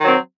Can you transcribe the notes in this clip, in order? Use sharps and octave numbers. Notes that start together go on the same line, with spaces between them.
D#3 F#3 C4